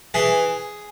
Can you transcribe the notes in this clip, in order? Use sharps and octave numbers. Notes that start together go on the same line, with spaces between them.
E3 G#4